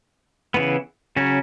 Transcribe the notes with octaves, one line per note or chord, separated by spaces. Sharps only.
C#3 E3 B3
C#3 F#3 C#4